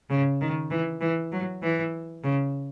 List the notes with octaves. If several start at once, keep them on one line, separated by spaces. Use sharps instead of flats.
C#3
D#3
E3
E3
F#3
E3
C#3